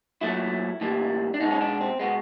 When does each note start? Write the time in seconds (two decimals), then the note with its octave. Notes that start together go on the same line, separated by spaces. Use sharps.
0.21 A#2 F#3 A3 E4
0.81 A2 E3 G3 A#3
1.34 D4
1.40 B2 G#3 D#4
1.51 C#4
1.61 D4
1.81 C4
1.99 B2 G#3 B3